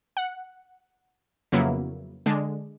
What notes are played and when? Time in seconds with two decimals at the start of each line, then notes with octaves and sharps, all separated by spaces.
0.17 F#5
1.52 F2 C#3 F#3 A#3 B3 E4
2.26 D3 G#3 D4